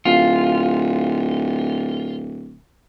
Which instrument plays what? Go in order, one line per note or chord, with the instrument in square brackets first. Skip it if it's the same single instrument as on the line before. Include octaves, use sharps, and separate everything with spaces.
[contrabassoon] D1 [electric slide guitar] F4